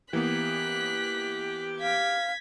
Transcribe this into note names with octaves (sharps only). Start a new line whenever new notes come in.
E3 A#3 B3 G4 F#6 B6
F5 G#6 B6